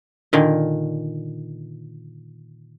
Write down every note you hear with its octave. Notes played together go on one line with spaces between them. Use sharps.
A#2 D3 D#3